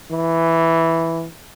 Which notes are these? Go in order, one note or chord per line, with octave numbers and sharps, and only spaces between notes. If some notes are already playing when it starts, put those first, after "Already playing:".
E3